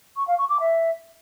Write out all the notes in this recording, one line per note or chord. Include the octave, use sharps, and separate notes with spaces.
C#6
F5
C#6
D6
E5